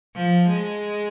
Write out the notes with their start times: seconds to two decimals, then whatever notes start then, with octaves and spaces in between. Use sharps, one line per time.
0.16 F3
0.48 G#3